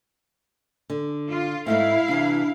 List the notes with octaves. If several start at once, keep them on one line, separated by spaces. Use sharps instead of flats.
D3
F4
G#2 A3 C4 E4 E5 F5
C3 E3 D4